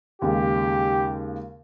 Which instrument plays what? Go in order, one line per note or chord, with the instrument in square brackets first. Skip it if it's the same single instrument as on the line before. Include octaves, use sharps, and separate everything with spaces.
[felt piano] D#2 C#3 G#3 [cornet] G4